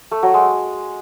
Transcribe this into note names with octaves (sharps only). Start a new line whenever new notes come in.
A3
F#3
G#3